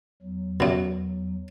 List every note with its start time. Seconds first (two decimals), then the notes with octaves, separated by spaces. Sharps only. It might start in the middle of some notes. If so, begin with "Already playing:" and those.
0.22 E2 F#3
0.60 F#2 B2